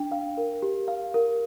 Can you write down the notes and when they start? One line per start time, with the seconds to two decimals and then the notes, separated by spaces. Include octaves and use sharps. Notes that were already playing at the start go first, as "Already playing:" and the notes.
Already playing: D4 G5
0.12 F5
0.37 A#4
0.62 G4
0.88 F5
1.14 A#4